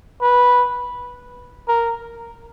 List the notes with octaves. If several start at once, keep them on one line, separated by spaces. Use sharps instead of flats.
B4
A#4